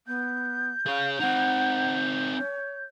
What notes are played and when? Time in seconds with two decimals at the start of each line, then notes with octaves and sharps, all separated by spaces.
0.07 B3 G6
0.87 G#4 C#5 F5
1.20 C4 D#4 F#5
2.38 C#5